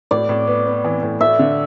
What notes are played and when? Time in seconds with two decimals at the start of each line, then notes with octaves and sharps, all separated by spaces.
0.11 A2 D5
0.29 A2
0.47 B3
0.66 B3
0.84 E3
1.03 A2
1.21 A3 E5
1.39 D3